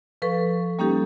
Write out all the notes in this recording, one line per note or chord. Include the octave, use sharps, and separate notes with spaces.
F3 A4 B4 C#6
G3 A#3 C#4 D#4 G4 A4